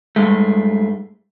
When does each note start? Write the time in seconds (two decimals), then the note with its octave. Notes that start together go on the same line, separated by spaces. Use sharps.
0.16 G2 G#3 A3